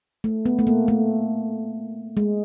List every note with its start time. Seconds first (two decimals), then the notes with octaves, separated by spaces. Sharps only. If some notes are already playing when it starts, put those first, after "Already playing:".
0.24 A3
0.46 B3
0.59 A3
0.67 A#3
0.88 A3
2.17 G#3